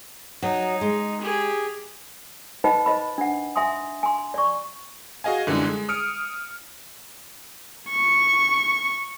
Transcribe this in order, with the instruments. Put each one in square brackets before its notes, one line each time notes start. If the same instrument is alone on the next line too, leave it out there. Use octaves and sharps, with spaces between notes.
[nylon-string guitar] F#3 [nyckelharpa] D#4
[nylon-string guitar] G#3
[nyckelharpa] G4 G#4
[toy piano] D#4 B4 C5 D#5 G5 B5
C5 D#5 B5
D4 F#5
E5 G#5 C6 D#6
G#5 C6
D5 C#6
[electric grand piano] F#4 G#4 D#5 F5 G#5
F#2 D3 E3 G3 G#3 D#4
G#3
D#6 F6 C#7 D7
[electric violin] C#6